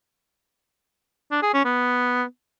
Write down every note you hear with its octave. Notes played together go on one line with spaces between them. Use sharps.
D4
G#4
C#4
B3